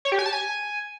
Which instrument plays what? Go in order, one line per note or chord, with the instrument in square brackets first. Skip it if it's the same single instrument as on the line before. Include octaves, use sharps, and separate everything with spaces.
[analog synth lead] C#5
G4
G#5
A5
G#5